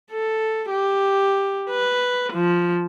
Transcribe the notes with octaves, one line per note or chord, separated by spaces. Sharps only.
A4
G4
B4
F3